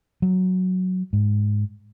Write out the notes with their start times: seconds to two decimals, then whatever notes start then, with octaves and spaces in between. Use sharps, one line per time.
0.22 F#3
1.13 G#2